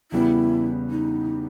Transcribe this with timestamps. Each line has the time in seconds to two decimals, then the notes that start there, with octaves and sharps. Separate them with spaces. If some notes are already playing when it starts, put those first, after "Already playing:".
0.12 E2 C#3 G3 B3 E4
0.90 D#4